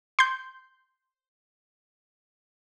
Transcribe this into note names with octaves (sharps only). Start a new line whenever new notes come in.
C6 G6